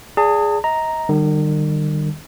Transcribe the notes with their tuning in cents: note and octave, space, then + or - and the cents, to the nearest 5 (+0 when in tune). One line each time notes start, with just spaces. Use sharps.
G#4 +0 D5 -25 A5 +40
D#5 +30 A#5 +0
D#3 -40 G3 +0